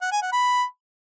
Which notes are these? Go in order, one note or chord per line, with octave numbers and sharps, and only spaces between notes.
F#5
G#5
F#5
B5